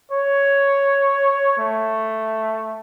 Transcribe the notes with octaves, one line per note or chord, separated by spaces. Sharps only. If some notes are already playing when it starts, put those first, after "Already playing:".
C#5
A3